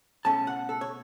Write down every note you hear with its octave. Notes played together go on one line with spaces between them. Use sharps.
B2 A3 C#4 A5
F#5
A4
C#5